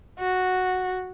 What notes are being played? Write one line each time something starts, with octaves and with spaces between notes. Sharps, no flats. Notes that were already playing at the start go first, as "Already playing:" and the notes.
F#4